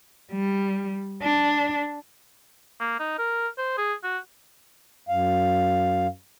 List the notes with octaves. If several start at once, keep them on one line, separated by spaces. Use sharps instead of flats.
G3
D4
A#3
D#4
A#4
C5
G#4
F#4
F#2 F5